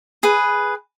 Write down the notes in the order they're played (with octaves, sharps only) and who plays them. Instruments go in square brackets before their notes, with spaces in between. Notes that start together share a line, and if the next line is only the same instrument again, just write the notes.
[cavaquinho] G#4 B4